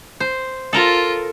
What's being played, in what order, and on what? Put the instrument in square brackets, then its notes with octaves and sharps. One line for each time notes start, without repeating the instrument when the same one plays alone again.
[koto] C5
[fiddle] F4 [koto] A4 A#4 A#5